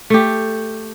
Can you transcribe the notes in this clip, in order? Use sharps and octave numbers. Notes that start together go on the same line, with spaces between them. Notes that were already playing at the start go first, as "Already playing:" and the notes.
A3 G4